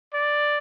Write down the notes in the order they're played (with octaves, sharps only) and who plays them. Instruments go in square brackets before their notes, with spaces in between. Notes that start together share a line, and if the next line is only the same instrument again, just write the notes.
[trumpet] D5